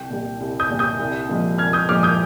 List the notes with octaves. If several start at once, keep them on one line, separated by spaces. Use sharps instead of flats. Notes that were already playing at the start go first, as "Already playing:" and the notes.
Already playing: C2 G5
A#2 G3
C2
D#6 G6
A#2 G3
D#6 G6
C2
A#2 F3 G#3
C2 F6 G#6
D#6 G6
A#2 F3 G#3 D6 F6
D#6 G6